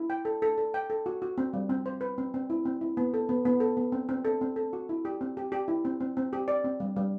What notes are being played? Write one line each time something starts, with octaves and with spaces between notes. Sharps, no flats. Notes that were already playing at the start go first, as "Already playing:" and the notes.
Already playing: E4
G5
A4
A4
A4
G5
A4
F#4
F#4
C4
G3
C4
C5
B4
C4
C4
E4
C4
E4
B3
A4
B3
B3
A4
B3
C4
C4
A4
C4
A4
F#4
E4
G4
C4
G4
G4
E4
C4
C4
C4
G4
D5
C4
G3
G3